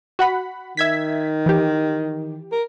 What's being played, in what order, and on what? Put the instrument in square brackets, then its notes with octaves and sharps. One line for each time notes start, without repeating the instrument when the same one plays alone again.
[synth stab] F#4 F#5 B5
[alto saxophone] D#3 [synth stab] E5 G#6 B6
[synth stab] E3 G4
[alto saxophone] A#4